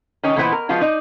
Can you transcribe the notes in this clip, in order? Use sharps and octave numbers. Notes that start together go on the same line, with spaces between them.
D#3 C#4 D#4
A#2 E3 B3 E4 C5 F#5
A#4
F3 G#3 B3 F4 F#4
D#4 D5